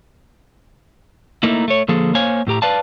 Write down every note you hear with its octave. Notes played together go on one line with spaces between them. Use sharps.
A3 A#3 D#4 E4
A3 C#5
D3 F3 A#3 G#4 A4
A#3 C5 C#5 F5 G#5
A2 A3 G4 A#5
B4 D5 F5 A5